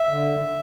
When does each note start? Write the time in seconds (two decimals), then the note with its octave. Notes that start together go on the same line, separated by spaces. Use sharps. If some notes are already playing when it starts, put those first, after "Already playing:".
Already playing: E5
0.09 D3